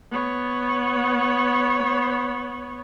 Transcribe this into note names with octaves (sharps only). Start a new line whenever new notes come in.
B3 C#5